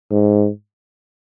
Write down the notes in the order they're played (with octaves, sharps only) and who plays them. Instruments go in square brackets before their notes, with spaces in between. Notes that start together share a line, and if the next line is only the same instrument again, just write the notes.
[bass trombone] G#2